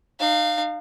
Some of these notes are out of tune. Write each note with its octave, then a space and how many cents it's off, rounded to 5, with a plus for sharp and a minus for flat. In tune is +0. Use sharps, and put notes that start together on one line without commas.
D#4 -35 F5 +0